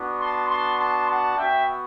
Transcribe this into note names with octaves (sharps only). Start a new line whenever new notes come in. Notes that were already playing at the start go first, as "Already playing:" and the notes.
Already playing: B3 D4 F#4
A5 C6
A5 C6
A5 C6
F#5 A5
B3 F#4 E5 G5